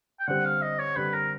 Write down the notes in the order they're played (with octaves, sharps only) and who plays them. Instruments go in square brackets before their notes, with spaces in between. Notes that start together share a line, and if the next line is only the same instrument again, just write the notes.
[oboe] G5
[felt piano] D3 G3 C4 [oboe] F#5
[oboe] F5
D#5
C#5
[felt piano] D3 G3 C4 [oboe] B4
[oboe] A#4